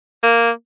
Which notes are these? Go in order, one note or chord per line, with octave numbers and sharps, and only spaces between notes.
A#3